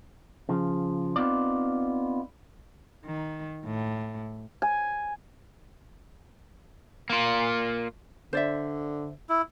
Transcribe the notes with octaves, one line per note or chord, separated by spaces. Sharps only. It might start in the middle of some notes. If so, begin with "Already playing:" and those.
C#3 F3
B3 C4 D#4 F4 D5
D#3
A2
G#5
A#3 F4
D3 C5 D5 E5
E4